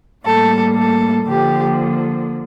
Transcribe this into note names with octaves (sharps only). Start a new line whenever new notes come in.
A2 G3 A#3 A4
A4
D3 F3 A#3 G4